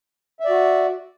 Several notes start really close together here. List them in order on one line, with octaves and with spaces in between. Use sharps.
E5 D5 F#4